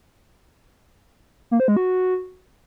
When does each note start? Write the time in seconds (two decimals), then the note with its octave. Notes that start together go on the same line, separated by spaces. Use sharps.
1.51 A#3
1.60 C5
1.68 G#3
1.77 F#4